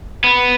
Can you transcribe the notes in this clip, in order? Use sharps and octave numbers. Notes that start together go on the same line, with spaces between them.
B3